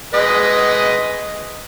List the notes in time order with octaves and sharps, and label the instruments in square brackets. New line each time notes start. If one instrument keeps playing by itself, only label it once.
[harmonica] G#3 B4 D#5